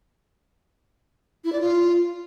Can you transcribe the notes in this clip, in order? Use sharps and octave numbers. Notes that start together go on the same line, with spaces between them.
E4
D5
F4